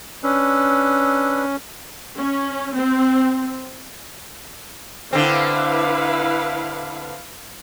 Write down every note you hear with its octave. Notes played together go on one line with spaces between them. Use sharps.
C#4 D4 B4 E6
C#4
C4
D3 C4 E4 B4 F5